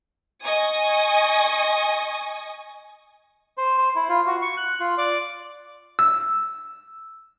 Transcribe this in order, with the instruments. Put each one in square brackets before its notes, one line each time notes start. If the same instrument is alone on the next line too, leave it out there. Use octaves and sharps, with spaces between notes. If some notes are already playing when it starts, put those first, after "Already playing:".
[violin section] D#5 G#5 C#6 D#6
[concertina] C5
C5
E4
F4
F#4
C#6
F#6
F4
D5
[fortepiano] E6